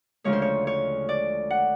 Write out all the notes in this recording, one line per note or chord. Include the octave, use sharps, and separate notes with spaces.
D2 C#3 F3 G#3 C#5
C5
C#5
C#5
D5
F#5